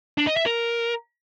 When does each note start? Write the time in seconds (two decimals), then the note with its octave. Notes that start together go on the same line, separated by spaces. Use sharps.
0.18 D4
0.27 D#5
0.37 E5
0.46 A#4